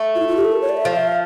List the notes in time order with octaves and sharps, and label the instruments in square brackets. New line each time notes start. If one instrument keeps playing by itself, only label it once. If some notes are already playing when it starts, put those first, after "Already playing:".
Already playing: [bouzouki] A3
[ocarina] F4
E4
F4
G4
A4
A#4
C#5
D5
E5
[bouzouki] F3 [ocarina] F5
[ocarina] E5
F5